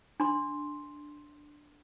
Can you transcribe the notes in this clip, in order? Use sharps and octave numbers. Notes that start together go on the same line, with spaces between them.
D4 C6